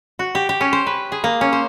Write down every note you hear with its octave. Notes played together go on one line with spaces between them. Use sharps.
F#4
G4
G4
C#4
C5
B4
G#4
A#3
C#4
C5